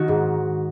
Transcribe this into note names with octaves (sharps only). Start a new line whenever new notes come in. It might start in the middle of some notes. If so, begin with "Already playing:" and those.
Already playing: D#3 D#4 F#4
G#2